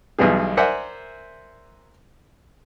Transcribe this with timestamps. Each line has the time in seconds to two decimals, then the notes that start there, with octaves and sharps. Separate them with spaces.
0.19 B1 B2 E3 G3 G#4
0.57 A#4 C5 D5 E5 F#5 G#5